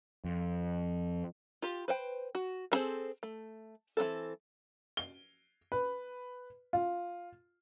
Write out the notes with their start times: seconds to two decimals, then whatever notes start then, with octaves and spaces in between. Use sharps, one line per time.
0.24 F2
1.62 F4 G4
1.88 B4 C5 G5
2.35 F#4
2.72 B3 C4 G#4 A4 C5
3.23 A3
3.97 E3 F#3 C4 A4
4.97 G7
5.72 B4
6.73 F4